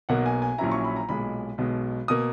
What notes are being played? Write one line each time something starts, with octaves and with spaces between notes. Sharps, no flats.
B1 B2 A#3 F#5
G#5
G#5
A#1 A#2 F#3 C#4 E4 A#5
C#6
B5
A#5
B1 A#2 G#3 B5
B1 B2 G#3
B2 A#3 D#6